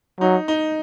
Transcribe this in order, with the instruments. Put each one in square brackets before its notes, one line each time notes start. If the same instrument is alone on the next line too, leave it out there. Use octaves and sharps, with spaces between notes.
[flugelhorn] F#3 [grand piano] D#4
[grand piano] D#4